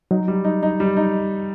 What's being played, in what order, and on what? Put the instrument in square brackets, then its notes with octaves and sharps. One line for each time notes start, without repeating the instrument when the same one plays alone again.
[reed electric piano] F#3 [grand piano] D#4
[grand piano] G3
D#4
D#4
G3
D#4